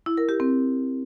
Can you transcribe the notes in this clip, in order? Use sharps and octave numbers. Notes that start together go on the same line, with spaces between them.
E4
A#4
G4
C4